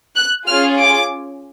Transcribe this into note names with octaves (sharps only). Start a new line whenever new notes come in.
F#6
C#4 F4 G#4 F6
D6